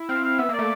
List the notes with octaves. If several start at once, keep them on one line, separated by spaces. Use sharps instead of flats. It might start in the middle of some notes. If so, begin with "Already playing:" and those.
Already playing: E4
C4 F5
F5
B3 E5
A#3
D5
A3